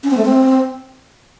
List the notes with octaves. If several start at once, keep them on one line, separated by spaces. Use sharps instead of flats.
C#4
C4
A3
C4